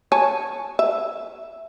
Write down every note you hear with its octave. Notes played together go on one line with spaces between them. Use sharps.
C#5 G#5 A5
E5